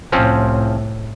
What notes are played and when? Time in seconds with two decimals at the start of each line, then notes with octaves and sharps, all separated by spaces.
0.12 C2 A2 F3 C4 C#4